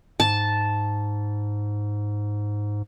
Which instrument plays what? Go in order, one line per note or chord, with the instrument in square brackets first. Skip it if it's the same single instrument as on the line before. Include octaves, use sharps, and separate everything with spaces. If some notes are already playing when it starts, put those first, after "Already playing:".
[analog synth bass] G#2 [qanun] A5